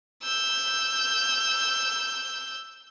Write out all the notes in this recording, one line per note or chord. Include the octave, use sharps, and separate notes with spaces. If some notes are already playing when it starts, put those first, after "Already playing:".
E6 G6